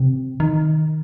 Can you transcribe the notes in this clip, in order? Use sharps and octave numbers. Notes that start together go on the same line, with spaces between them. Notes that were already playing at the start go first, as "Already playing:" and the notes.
Already playing: C3
D#3